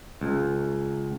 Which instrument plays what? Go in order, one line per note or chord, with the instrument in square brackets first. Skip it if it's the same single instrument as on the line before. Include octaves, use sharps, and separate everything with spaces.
[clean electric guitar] C#2